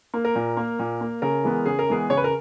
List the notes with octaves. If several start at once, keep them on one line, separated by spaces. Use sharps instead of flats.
A#3
A#4
A#2
A#3
A#2
A#3
C#3 A#4
E3 G#3 B3
C#3 G#4
A#4
E3 G#3 B3 G#4
C#3 C#5
B4
A#4